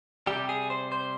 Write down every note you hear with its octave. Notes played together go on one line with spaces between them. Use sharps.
C3 G3 G4
G#4
C5
C5